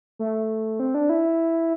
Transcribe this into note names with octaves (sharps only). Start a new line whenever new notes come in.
A3
C4
D4
E4